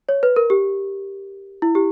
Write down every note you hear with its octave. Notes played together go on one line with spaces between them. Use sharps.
C#5
B4
A#4
G4
E4
G4